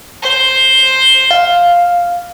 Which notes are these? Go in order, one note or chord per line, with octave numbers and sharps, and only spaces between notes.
C5
F5